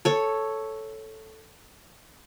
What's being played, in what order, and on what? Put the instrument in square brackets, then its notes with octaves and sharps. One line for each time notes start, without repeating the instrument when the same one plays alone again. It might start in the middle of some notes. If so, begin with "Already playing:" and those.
[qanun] A4 C#5